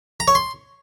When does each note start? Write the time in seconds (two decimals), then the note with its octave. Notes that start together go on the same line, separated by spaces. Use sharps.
0.20 A#5
0.28 C#5
0.35 C6